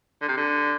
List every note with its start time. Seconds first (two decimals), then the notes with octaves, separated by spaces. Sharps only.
0.21 D3
0.28 C3
0.37 D3